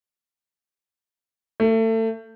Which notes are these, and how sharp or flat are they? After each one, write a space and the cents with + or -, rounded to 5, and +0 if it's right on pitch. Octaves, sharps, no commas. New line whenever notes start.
A3 +30